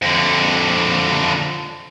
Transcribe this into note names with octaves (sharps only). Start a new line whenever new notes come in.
F2 D3